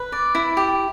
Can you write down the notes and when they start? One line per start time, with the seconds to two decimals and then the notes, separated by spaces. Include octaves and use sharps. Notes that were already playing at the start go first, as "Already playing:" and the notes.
Already playing: B4
0.12 D5
0.35 E4
0.57 G4